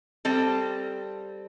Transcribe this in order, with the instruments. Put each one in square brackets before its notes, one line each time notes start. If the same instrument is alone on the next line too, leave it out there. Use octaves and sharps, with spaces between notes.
[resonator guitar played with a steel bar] G3 C4 A4